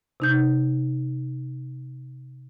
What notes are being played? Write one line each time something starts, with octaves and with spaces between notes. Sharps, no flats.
C3 D#4 G6